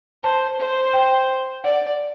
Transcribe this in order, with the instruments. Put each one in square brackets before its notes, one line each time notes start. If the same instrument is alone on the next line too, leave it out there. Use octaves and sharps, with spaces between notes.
[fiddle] C5 [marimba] A5
[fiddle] C5
[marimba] G5
[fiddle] D5 [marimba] F#5